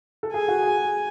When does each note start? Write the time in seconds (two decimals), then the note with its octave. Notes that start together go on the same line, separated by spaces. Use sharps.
0.23 A4
0.34 G#4 G#5
0.48 F#4
0.62 G#4
0.76 G#4